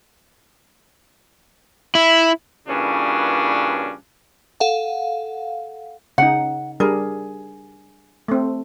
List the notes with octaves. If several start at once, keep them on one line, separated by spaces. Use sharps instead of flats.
E4
G2 A#2 C#3 E3 C#4 D4
A4 F5 F#5
C#3 D#4 F#5
G3 D4 G#4 A#4
A3 C4